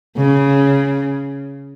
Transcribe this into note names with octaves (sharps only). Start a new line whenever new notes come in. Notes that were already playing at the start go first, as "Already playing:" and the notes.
C#3